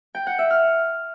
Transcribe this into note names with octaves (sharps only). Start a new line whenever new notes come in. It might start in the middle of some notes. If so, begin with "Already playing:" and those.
G5
F#5
E5
F6